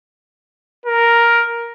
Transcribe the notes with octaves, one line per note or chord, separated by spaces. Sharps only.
A#4